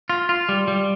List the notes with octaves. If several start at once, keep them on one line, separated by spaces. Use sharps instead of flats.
F4
F4
G3
G3